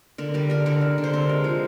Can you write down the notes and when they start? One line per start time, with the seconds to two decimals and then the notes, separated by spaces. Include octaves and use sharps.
0.18 D3 A#4
0.34 G3 A#4
0.50 D3 A#4
0.66 D3 A#4
0.81 D3
0.98 D3
1.04 C5
1.13 C3 A#4
1.29 G#3
1.44 F3